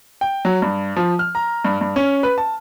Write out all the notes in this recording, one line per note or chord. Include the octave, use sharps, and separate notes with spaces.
G5
F#3
G2
F3
F6
A#5
G2
G2
C#4
B4
A5